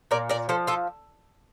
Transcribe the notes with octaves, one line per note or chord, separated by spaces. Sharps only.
A#2 A#4 D5
A#4 D5
F3 A4 C5
F4 A4